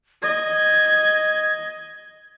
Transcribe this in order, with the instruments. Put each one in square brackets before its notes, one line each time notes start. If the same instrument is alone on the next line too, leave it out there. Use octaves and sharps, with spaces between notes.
[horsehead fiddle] D#5 [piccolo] G#6